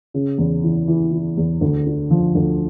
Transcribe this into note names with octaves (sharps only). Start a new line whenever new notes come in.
C#3
E2
E3
E3
E3
E2
D2
D3
F3
D2